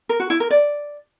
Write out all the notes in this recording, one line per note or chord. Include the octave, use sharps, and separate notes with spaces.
A#4
F#4
E4
A#4
D5